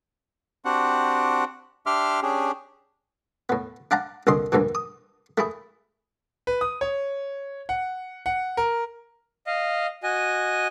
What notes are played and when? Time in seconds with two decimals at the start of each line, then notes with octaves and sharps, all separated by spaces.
0.65 C4 D4 F#4 G4 F#5
1.86 D4 G4 E5 C6 D6 F6
2.22 C#4 D4 G4 G#4
3.49 A2 B3
3.91 D4 F5 F#5 A5 A#5
4.27 C2 A#2 D3 D#5 C6
4.52 D2 G2 A#2 D3 E3
4.75 D#6
5.38 A3 E4 G#4
6.47 B4
6.61 D#6
6.81 C#5
7.69 F#5
8.26 F#5
8.57 A#4
9.47 D#5 F5
10.03 F#4 D#5 G#5